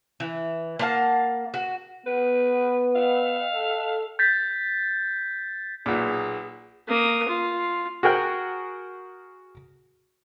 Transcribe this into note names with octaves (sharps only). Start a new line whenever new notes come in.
E3
A#3 F5 F#5 A5
F#4
B3 B4
F5
A4
G6 A6 B6
B1 A#2 G#4
A#3 D#6
F4
F#4 G#4 A#4 G5 F#6